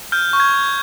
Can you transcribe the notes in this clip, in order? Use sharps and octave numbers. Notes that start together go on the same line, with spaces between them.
F6 G6
C#6
G#6
C#6